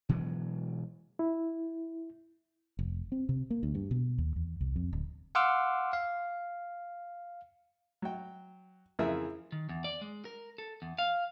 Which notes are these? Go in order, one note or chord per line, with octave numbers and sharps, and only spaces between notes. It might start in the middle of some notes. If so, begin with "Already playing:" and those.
B2 E3 F#3 G#3
E4
F1
C4
C3
A#3
D2
G2
B2
D#2
E2
C2
F2
D1
F5 F#5 C6 D6 E6 F6
F5
F#3 G5
F2 C#3 E3 G#4 A#4 E5
D#3
E2
D5
G#3
A#4
A4
E2
F5